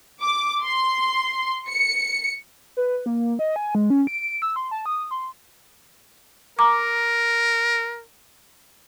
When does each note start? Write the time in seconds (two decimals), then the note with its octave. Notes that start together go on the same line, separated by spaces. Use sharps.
0.22 D6
0.62 C6
1.68 C#7
2.77 B4
3.06 A#3
3.39 D#5
3.56 G#5
3.75 G#3
3.90 C#4
4.07 D7
4.42 E6
4.56 C6
4.71 A5
4.86 D#6
5.11 C6
6.59 A#4 A#5 D6